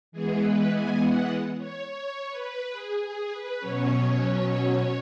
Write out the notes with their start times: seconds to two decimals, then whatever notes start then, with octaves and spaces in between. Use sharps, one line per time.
0.12 E3 G#3 B3 G#4
0.41 B4
0.71 G#5
1.00 F#5
1.58 C#5
1.86 C#5
2.30 B4
2.73 G#4
3.02 G#4
3.31 B4
3.60 B2 F#3 C#4 C#5